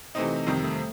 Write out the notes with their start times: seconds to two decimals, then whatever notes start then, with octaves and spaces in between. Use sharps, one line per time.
0.15 C3 E3 A3 C4 D#4
0.47 F2 C3 D#3 G3
0.63 A3